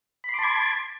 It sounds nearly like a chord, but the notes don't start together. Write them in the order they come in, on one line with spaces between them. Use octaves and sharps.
B5 C6 D6 A5 G#6